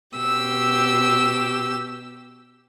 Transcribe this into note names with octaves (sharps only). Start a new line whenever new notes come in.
B2 G4 E6